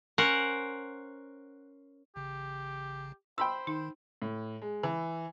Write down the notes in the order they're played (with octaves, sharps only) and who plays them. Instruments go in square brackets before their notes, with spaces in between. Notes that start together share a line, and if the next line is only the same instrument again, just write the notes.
[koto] C#4 A#4 C5 F#5
[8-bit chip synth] A1 C#3 [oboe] G4
[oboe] C5 [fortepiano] G5 B5 E6 [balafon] C6
[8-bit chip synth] D#3 [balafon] D#4
[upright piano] A2
G#3
E3